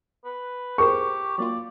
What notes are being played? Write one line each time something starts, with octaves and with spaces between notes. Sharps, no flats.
B4
G4 G#4 A#4 C5 C#6
F#3 A#3 F4 D5